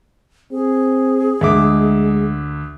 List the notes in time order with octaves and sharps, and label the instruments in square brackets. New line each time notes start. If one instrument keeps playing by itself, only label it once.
[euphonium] C4 [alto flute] G#4
[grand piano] D2 E5 D6 [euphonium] G#3